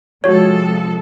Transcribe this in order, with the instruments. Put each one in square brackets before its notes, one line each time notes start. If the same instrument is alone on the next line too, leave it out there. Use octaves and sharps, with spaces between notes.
[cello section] C3 G#3 A4 [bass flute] F3 [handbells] F#4 C#5